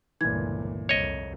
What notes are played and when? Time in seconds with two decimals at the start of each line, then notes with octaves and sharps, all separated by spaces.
0.21 G1 C#2 A#2 E3 G#6
0.89 C2 F2 C#5 D#5